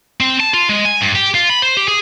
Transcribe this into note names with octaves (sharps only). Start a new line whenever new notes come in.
C4
A5
F4
G#3
G#5
G2
G4
F4
B5
C5
G4
G#4